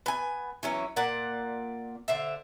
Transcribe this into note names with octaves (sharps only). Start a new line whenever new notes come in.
B3 G#5
E3 F#3 C#4
A#2 A#3 D5 F#5
D3 C5 E5